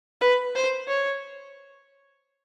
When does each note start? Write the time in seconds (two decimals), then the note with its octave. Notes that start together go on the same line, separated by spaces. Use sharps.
0.21 B4
0.55 C5
0.88 C#5